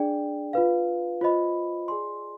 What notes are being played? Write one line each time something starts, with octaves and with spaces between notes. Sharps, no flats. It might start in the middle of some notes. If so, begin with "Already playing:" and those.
Already playing: D4 G#4 D5 G5
F4 B4 F5
F4 C5 D#5 B5
G#4 D5 G#5 C6